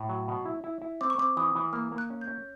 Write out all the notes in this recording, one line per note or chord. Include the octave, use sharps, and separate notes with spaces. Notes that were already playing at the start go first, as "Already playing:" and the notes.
Already playing: A2
F#3
B2
E4
E4
E4
C4 D6
C#6
C4 D6
E3 D#6
E3
A#3 F6
A#3
F#6
C#4
G6
C#4